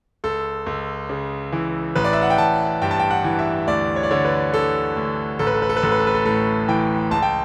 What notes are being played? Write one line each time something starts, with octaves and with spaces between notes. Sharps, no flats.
C#2 A4
C#2
C#3
E3
A1 B4
D5
E5
F#5
G5
A1 A5
G2 G5
A5
G5
F#5
E3
E5
D2 D5
C#5
D5
D3 C#5
B4
D3 A4
D2
A1 A4
B4
A4
B4
A4
B4
A1 A4
B4
A4
B4
A4
A2 A4
E3 G5
C#2 A5
G5